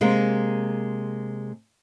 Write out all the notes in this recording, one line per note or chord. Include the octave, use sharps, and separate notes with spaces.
C3 G#3 A#3